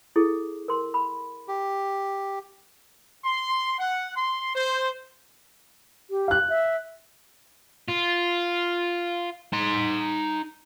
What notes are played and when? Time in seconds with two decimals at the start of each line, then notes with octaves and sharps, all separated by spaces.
0.16 E4 G#4 A4
0.68 A#4 C6
0.94 B5
1.48 G4
3.24 C6
3.79 F#5
4.16 C6
4.55 C5
6.11 G4
6.28 F5 F#6
6.49 E5
7.89 F4
9.53 D#4 C6